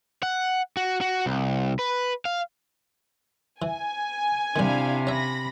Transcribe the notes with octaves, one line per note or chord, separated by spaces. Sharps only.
F#5
F#4
F#4
C2
B4
F5
E3 G#5
C3 D#3 G3 D4 E4 F5
C#4 E5 B5 A#6